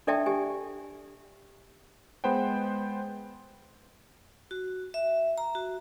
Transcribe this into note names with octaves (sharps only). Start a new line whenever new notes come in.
D4 A4 D5 E5 G5 A5
G4 G#5
G#3 B3 B4 C5 F#5 G5
F#4
E5
A#5
F#4